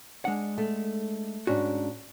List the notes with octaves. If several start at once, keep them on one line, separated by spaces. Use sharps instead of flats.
G#3 D4 F#5
A3
G#2 C#4 D4 F#4